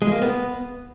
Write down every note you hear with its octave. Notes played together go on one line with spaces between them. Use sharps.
G#3
A#3
B3